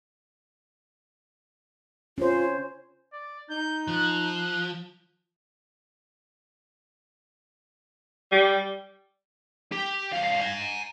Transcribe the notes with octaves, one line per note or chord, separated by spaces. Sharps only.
C#4 F4 C5
D5
D#4 G6
F3 F#6
G3
G4
C2 F5
G#5 A#5